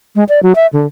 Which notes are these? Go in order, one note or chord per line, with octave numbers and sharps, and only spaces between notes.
G#3
D5
F#3
E5
D3